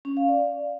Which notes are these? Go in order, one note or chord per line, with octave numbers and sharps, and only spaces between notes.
C#4
F5
D5